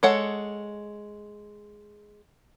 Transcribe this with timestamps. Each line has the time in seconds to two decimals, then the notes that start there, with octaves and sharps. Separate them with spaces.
0.03 G#3 A4 C#5 F#5